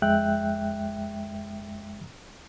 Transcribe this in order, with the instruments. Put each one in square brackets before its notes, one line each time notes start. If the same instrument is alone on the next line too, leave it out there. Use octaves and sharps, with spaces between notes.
[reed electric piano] F2 G#3 E5 G5 F#6